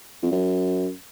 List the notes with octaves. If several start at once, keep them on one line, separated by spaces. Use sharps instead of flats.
F2
F#2